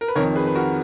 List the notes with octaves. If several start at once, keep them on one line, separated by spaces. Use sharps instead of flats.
A#4
B4
F2 D#3 A#4 C#5
G#4 B4
B4
F#4 A#4